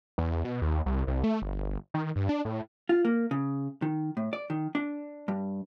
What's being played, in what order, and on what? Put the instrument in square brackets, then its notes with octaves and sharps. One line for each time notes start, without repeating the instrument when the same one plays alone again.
[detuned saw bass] E2
B2
D#2
C2
C2
A3
G1
D#3
G2
D4
A2
[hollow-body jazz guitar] F4
A#3
C#3
D#3
A2
D5
D#3
D4
G2